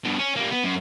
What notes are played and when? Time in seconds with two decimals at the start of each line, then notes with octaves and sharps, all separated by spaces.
0.04 G2 B2
0.19 C#4
0.36 G3 A#3
0.51 B3
0.64 F#2